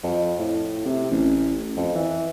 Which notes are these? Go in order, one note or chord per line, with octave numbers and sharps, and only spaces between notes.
F2
A2
C3
A1
F2
E3